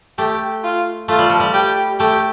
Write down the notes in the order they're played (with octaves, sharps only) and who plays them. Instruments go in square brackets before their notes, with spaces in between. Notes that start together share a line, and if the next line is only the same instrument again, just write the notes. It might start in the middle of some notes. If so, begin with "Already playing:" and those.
[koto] A3 [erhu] G4
[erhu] F4
[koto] A3 [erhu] F4
[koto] G3
F3
G3
[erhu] G4
[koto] A3 [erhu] G4